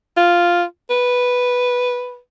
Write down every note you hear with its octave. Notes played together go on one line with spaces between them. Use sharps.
F4
B4